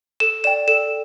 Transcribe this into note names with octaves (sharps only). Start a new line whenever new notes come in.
A4 E7
D5 G5 E7
A4 E7